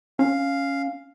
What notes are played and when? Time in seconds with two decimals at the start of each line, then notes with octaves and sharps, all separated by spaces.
0.19 C#4 F5